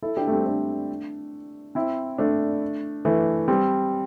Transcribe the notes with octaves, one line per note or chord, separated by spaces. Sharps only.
E4 A4
D4 G4
A3
G3 C4
A3 D4
C4 E4
A3 D4
E3 A3
G3 C4